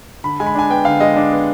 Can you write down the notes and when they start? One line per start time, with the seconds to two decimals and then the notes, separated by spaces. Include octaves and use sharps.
0.24 D3 B5
0.40 G#3 G#5
0.47 B5
0.55 D4 G#5
0.70 B3 G5
0.85 D3 F5
1.00 G#3 D#5
1.16 D4
1.32 B3